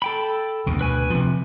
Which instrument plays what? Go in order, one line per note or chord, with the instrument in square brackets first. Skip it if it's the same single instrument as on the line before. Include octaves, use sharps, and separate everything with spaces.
[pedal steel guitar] A4 G5 B5
[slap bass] D2 B2
[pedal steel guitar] B4 G#5
[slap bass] C3 F3